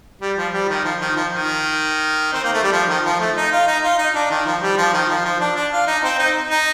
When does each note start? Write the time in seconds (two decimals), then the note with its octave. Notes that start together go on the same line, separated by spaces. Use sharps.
0.21 G3
0.37 F3
0.53 G3
0.69 D#3
0.84 F3
1.00 D#3
1.16 F3
1.31 D#3
2.33 C4
2.43 A#3
2.53 A3
2.63 G3
2.73 F3
2.89 D#3
3.05 F3
3.20 A3
3.36 D#4
3.52 F4
3.67 D#4
3.83 F4
3.98 D#4
4.15 D4
4.30 D#3
4.46 F3
4.62 G3
4.77 F3
4.93 D#3
5.09 F3
5.24 F3
5.40 D4
5.56 D4
5.72 F4
5.87 D#4
6.03 C4
6.19 D#4
6.50 D#4